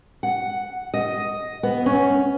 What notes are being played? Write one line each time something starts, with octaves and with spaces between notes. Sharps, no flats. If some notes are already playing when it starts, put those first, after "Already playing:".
F#5
D#5
B3
C#4